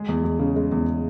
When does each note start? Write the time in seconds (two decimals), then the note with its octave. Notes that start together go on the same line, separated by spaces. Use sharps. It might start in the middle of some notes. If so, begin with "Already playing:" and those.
Already playing: G#3 G#4
0.08 E2
0.24 E2
0.39 C#3
0.56 G#3
0.72 E2